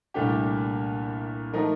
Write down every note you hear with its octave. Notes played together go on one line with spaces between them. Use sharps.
C2 A#2 A3 D4 G4
F3 A3 D#4 A#4